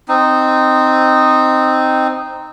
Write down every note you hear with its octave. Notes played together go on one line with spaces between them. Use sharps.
C4 D#4